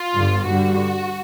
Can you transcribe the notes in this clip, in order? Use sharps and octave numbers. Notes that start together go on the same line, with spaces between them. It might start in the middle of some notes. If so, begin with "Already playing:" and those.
Already playing: F4
G1 G2 D3
G2 D3 G3 F#4